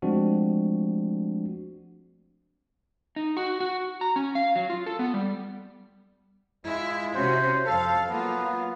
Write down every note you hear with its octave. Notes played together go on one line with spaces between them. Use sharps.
F3 G#3 A3 C4 D4 F#4
D#4
F#4
F#4
A#5
C#4
F5
F#3
F4
A4
B3
G3
G#3 E4 F4 E5
C3 C#4 F#4 C5
F2 A4 F5
F#3 A#3 B3 F4